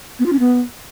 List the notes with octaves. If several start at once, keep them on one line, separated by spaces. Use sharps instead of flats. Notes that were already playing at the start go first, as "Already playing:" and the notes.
B3
F4
C#4
B3